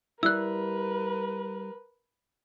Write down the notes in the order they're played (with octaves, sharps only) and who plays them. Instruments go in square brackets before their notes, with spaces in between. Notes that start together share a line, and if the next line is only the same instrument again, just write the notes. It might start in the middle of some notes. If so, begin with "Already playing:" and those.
[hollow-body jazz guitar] G3 E4 [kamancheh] A#4 B4 [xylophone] E6 F#6